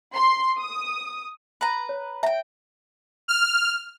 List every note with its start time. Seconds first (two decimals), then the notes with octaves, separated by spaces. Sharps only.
0.15 C6
0.58 D#6
1.61 B4 A#5
1.89 C#5
2.23 E5 G5 A#5
3.28 F6